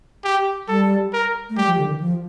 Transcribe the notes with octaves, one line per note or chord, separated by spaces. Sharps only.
G4
G3 A4
A#4
A3
G3 G4
F3
D3
D#3
F3